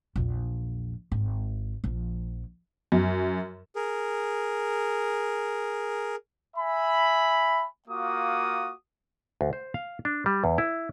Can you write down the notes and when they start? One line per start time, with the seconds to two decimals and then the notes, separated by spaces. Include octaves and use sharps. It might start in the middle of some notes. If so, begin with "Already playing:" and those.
0.16 A#1 E2
1.12 G#1
1.84 A#1 F3
2.92 F#2
3.76 G#4 A#4
6.57 E5 G#5 B5
7.89 A#3 F4 F#4 D6 D#6
9.41 D2
9.53 C5
9.74 F5
10.05 D4
10.26 G3
10.44 E2
10.58 E4